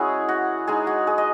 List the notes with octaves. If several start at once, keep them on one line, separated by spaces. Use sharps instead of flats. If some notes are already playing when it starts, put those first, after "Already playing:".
Already playing: G#3 C#4 E4 F#4 G#4
F#4
G#3 D#4 G#4
F#4
G#4
D#5